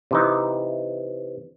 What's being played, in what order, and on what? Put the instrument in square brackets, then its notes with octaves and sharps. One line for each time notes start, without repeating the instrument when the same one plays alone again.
[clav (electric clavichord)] C3 E3 D#4